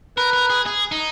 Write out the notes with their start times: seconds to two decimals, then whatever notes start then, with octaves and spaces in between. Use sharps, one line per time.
0.17 A#4 B4
0.33 A#4
0.50 G#4
0.66 G#4
0.92 D#4